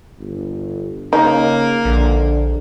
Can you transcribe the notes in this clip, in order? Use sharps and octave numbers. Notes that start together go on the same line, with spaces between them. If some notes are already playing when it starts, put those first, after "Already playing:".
G1
C#3 A#3 D#4
A#1 D3